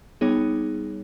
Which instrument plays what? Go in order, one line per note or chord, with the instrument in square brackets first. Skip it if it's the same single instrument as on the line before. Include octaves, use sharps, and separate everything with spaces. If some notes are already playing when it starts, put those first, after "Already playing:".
[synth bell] G3 B3 D#4 G#4 C#5